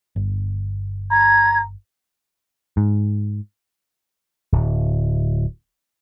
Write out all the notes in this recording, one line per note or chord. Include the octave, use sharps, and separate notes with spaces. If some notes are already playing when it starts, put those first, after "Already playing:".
G1
A#5 G#6
G#2
D1